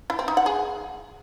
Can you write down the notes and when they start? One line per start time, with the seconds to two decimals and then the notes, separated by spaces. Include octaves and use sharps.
0.10 E4
0.19 C4
0.28 D#4
0.37 F#5
0.46 G#4